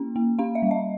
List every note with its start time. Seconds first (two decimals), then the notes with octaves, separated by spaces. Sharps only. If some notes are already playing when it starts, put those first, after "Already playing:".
Already playing: A#3 C#4
0.16 A#3
0.39 C#4 F5
0.55 E5
0.62 G3
0.71 D#5